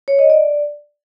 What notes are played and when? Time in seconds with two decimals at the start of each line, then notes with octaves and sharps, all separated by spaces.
0.08 C#5
0.19 D#5
0.30 D5